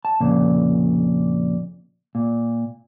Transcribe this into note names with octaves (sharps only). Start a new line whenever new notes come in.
A5
F2 A#2 C#3
A#2